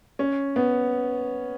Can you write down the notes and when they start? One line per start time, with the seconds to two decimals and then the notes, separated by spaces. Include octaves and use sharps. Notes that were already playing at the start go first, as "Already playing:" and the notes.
0.19 C#4
0.56 B3